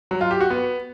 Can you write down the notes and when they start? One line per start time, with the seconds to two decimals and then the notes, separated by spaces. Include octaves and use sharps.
0.11 F#3
0.21 F4
0.31 G4
0.41 F#4
0.50 B3